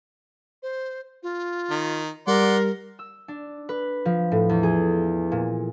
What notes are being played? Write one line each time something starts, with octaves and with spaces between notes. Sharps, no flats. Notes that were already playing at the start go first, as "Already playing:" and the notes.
C5
F4
D#3
G3 A#4 D5 F#5 C6
E6
D4
B4
F3
A2
E2
G#4
A#2